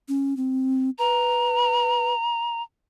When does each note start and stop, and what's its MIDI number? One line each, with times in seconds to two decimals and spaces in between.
0.09 0.36 61
0.37 0.90 60
0.99 2.14 71
0.99 2.62 82